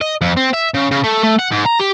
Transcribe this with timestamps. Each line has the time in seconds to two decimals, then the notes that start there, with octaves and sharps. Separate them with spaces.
0.01 D#5
0.22 F2
0.37 C4
0.54 E5
0.74 C#3
0.91 C#3
1.04 A3
1.24 A3
1.39 F#5
1.52 G#2
1.66 A#5
1.80 G4